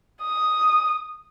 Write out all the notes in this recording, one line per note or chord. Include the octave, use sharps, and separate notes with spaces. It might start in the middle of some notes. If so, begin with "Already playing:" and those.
D#6